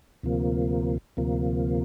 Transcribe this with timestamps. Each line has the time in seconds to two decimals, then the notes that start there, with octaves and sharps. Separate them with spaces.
0.23 D2 C3 F3 A#3
1.17 D2 C3 F3 A#3